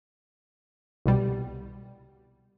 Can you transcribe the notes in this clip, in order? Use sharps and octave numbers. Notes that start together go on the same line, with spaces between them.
C2 B2 G3